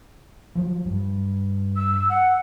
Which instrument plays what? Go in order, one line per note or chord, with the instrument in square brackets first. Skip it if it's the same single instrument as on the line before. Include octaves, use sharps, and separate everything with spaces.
[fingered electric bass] F3 F#3
G2
[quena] E6
F#5